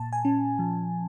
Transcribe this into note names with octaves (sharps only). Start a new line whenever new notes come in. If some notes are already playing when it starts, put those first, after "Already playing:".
Already playing: A#2 A5
G#5
C#4
F3